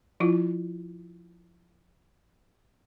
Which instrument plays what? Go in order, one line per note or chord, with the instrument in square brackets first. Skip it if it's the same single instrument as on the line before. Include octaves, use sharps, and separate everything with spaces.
[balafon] F3 E4 F4